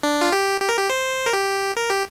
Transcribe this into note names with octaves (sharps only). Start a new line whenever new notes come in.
D4
F4
G4
G4
A#4
G4
C5
A#4
G4
A#4
G4